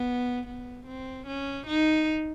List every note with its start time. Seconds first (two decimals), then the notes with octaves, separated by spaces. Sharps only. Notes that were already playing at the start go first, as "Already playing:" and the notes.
Already playing: B3
0.47 B3
0.87 C4
1.27 C#4
1.67 D#4